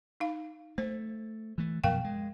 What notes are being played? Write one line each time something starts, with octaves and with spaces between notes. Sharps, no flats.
D#4 F5
A3 C5
E3 A3
F#2 B2 F3 A#4 F5 G5
G#3